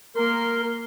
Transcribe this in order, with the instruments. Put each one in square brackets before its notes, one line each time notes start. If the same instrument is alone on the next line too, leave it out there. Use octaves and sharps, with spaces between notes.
[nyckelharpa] A#3 C6 [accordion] A#4